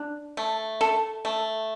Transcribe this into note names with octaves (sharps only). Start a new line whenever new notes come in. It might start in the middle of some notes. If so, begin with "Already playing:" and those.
Already playing: D4
A3
A4
A3